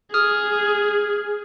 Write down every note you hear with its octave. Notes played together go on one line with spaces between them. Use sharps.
G#4 D#6 F6